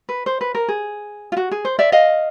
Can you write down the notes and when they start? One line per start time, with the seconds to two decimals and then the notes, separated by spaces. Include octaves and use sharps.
0.09 B4
0.26 C5
0.41 B4
0.55 A#4
0.68 G#4
1.32 F4
1.37 F#4
1.51 G#4
1.65 C5
1.79 D5 E5
1.92 D#5 F5